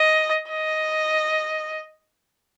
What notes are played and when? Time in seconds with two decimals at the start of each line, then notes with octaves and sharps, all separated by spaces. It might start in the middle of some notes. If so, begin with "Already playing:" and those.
Already playing: D#5
0.49 D#5